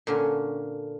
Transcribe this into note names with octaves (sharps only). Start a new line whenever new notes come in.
A#2 D3 C#4